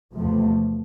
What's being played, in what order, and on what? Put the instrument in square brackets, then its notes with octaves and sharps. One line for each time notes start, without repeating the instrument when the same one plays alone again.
[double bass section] E2 C3 F3 A3